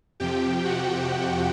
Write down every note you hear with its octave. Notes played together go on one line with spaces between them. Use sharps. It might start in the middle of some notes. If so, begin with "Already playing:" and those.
F2 C3 F3 G4 G5
F#4 F#5